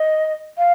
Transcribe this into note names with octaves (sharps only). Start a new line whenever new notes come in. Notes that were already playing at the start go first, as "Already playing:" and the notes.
Already playing: D#5
F5